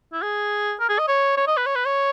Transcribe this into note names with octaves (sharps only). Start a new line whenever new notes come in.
E4
G#4
A#4
G#4
D#5
C#5
C#5
D#5
B4
C#5
B4
C#5